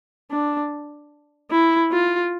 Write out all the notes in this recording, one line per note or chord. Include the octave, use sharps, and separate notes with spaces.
D4
E4
F4